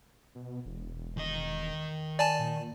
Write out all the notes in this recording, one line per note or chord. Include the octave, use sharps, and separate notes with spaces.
B2
E1
D#3 D#5
D5 G#5 A5
A#2